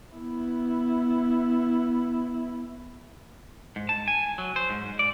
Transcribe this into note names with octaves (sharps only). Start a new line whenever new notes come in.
B3 E4
G#2
A5
G#5
F#3
C5
G#2
D5